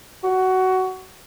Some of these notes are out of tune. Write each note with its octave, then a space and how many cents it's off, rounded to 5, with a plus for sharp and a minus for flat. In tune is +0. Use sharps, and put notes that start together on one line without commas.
F#4 +15